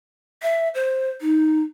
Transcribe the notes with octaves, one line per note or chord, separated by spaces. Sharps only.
E5
C5
D#4